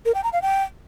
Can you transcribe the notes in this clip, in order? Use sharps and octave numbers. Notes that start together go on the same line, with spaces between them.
A#4
G5
A#5
F5
G5